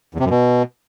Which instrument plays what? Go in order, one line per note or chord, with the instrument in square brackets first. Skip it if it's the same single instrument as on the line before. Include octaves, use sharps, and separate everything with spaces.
[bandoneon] E2
C3
F#2
B2